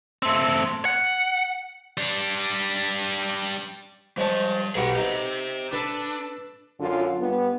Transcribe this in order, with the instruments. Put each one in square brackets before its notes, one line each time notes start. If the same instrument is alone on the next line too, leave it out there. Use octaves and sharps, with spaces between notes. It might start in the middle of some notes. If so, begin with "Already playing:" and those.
[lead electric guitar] A3 C4
F#5
[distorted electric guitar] G3 D4
[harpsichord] F3 G#3 C#5 [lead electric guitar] G3 A5
[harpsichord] B1 G3 C#6 [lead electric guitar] G#4 F#5
[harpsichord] D#4 [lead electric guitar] G4 C5
[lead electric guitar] D4 [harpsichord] A4 B4 A5
[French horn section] F#2 D3 F4
G2 B3